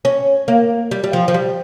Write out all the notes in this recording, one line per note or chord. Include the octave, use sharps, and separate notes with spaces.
C#4
A#3
G3
G3
F3
F3
G3